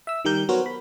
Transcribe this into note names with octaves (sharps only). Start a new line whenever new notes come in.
E5 E6
D#3 G3 G4 A#4 G6
F#3 B3 F#4 A#4 C5 C#5
B5